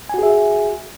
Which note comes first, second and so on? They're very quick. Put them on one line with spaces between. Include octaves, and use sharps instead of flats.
G#5 F#4 G#4 E5